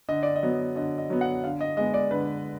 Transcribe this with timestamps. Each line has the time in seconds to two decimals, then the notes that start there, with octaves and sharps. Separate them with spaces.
0.09 D3 D#5
0.23 D5
0.36 D#5
0.43 F#3 B3
0.76 D3 D#5
0.98 D#5
1.10 F#3 B3
1.21 F#5
1.44 D3 F5
1.61 D#5
1.77 G#3 B3 D#5
1.94 D5
2.11 D3 B4